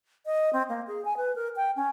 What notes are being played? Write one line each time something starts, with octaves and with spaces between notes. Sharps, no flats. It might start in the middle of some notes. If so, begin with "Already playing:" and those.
D#5
C4
A#3
G#4
G#5
B4
A#4
G5
C#4